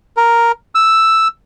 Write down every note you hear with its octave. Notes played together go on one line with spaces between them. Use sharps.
A#4
E6